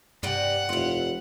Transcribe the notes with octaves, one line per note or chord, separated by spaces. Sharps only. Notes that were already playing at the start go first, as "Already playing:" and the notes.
G2 C3 B4 D5 F#5
F1 E4 F4